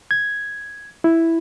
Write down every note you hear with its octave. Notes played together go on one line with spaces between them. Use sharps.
G#6
E4